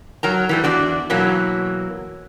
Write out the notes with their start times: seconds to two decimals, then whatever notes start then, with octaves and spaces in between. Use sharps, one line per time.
0.23 F#3 A#4 A#5
0.49 E3 G3 A3
0.64 E2 D4 F#4 D5
1.10 B2 E3 F#3 A#3